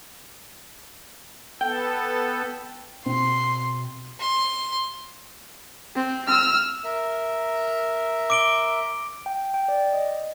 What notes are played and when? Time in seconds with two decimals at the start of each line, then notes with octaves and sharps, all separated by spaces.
1.61 B3 A4 G5
3.06 B2 C4 C6
4.19 C6
5.95 C4
6.27 E6 F6
6.84 A#4 E5
8.30 D6 D7 G7
9.26 G5
9.54 G5
9.68 D5
9.93 D#5